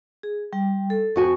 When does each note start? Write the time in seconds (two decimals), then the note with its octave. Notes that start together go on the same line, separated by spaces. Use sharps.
0.23 G#4
0.53 G3 G5
0.90 A4
1.16 F2 F#4 G#5 C#6